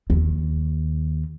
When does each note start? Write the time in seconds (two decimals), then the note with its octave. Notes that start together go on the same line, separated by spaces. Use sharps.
0.10 D#2